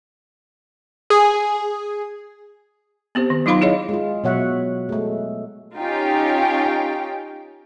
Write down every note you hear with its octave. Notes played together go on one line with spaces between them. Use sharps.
G#4
B3 C4 G4 C5
D#3
F#3 D#4 F4 F5 B5 C6
E4 G#4 C#5 D#5 F5
G#3 F4
B2 F#3 C#5 E5 F#5
G#3 A3
C#4 D#4 F4 G4 G5